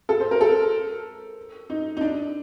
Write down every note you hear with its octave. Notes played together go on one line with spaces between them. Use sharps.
A4
C5
A#4
A4
D#4
D#4
D4